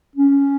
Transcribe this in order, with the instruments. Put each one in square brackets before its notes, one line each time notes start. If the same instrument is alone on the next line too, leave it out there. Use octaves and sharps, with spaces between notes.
[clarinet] C#4